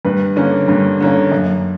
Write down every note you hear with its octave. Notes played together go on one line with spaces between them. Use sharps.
G2 B4
D3 A#3 C#4
G2
D3 A#3 C#4
F#2